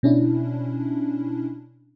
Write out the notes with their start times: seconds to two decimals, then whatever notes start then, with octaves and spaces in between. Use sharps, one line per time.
0.03 B2 C#4 D4 E4